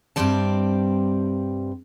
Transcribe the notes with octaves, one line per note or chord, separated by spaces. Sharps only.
G2 C3 G3 C4 D5 A5